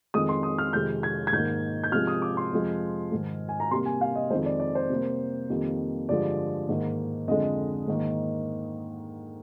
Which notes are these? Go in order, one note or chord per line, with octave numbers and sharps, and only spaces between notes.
F2 D#3 G#3 D#6
C6
D#6
F6
F2 C3 D#3 G#3 G6
G#6
G#6
G#2 D#3 A#3 G6
G6
C3 F3 G#3 F6
D#6
D6
C6
F2 C3 F3 G#3
G#2 D#3 G#3
G#5
A#5
C3 G3 A#3 C6
G#5
F5
D#5
F2 D#3 G#3 C5
D5
D5
C5
C3 G3 A#3
F2 D#3 G3 A#3
G2 D3 F3 G#3 D5
G#2 D#3 A#3
F2 D3 G#3 D#5
G#2 D#3 A#3